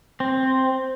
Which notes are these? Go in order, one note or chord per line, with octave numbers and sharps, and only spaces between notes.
C4